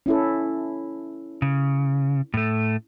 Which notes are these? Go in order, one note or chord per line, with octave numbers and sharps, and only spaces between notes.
C#4 E4 A4
C#3
A2 A3